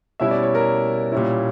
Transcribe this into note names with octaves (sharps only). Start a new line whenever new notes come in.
B2 G3 C#4 E4 E5
D5
C#5
A#4
A#2 G3 C#4 E4